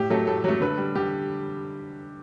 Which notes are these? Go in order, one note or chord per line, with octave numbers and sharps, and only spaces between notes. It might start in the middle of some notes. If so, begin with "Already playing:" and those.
Already playing: A2 G4
F#3 A3 A4
A2 A4
F#3 A3
D3 B4
G3
D3 G4